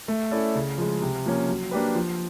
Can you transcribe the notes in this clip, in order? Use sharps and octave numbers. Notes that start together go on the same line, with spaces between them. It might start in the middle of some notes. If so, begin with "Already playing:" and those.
A3
C#4 E4 A4 D5
C#3
F3 G#3
C3
F3 A#3 C#4
F#3
A#3 D4 G4 B4
F3